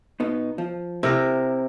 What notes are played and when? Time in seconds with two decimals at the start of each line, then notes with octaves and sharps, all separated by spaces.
0.20 B2 B3 D#4
0.58 F3
1.03 C3 E4 A#4